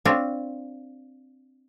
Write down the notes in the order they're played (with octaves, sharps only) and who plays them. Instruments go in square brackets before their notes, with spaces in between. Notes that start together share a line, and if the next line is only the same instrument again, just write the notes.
[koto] C4 D4 F4 C#5